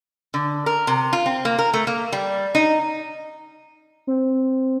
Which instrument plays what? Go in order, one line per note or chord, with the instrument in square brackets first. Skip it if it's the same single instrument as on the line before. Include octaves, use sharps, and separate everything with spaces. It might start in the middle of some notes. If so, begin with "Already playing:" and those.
[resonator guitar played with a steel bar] D3
A#4
C3
F4
C4
A#3
A#4
A3
A#3
G3
D#4
[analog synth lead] C4